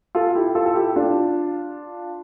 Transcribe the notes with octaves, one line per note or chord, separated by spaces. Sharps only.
F4 A4
E4 G4
F4 A4
A4
E4 G4
D4 F4